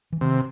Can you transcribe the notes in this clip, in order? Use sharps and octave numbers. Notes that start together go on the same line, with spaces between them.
E3
C3 D#3